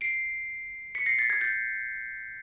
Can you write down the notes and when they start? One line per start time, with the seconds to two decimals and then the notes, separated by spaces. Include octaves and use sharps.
0.01 C7 D7
0.95 B6 C#7
1.06 A#6 C7
1.18 A6 B6
1.30 G#6 A#6
1.41 G6 A6